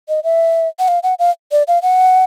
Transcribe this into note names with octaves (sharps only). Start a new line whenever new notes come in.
D#5
E5
F#5
F5
F#5
F5
D5
F5
F#5